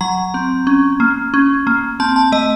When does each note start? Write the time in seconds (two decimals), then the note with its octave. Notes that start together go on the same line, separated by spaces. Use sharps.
0.01 F#3 A#5
0.34 C4
0.67 C#4
1.00 A#3
1.34 C#4
1.67 A#3
2.00 C4 A5
2.16 A5
2.32 A3 D#5